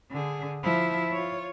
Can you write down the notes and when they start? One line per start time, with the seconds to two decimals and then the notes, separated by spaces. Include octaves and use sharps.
0.11 D3 G#4
0.63 F3 E4
1.12 F4 C#5